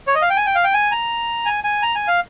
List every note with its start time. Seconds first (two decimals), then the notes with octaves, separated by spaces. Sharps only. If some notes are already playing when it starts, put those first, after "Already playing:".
0.07 C#5
0.15 D#5
0.22 F5
0.30 G5
0.37 G#5
0.46 G5
0.55 F5
0.64 G5
0.74 G#5
0.92 A#5
1.46 G#5
1.64 G#5
1.83 A#5
1.95 G#5
2.08 F5